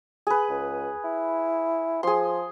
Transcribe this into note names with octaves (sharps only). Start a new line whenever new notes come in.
G#4 B4
C#2
E4
F3 G#4 C6